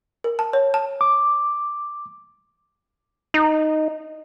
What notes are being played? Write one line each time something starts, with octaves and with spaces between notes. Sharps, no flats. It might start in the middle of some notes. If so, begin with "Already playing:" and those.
A#4
A5
C#5
A5
D6
D#4